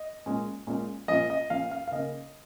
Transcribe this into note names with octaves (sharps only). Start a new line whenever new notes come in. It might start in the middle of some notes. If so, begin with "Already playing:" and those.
Already playing: D#5
A#2 G#3 C#4
A#2 G#3 C#4
A#2 F3 C#4 D#5
D#5
A#2 F3 C#4 F5
F5
F5
C#3 A#3 C#4 D#5